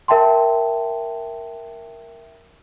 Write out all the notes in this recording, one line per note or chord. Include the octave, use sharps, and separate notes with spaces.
A#4 E5 G5 A5 C6